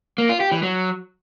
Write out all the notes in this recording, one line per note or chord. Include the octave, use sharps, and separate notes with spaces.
A#3
F4
G4
E3
F#3